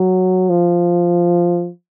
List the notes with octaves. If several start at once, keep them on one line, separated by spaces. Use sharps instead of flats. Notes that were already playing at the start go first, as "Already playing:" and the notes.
Already playing: F#3
F3